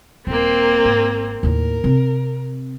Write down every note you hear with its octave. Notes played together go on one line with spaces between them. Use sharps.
D#1 A#3 C4
G#1
D#2 A2 A#4
C3 C4